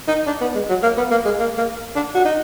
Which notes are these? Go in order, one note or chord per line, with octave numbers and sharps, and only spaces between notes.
D#4
D4
B3
G#3
F#3
A#3
B3
A#3
G#3
A#3
A#3
D4
F#4
D#4